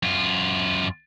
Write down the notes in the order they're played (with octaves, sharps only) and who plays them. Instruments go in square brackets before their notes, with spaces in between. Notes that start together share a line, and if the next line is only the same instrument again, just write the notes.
[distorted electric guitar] F#2 F4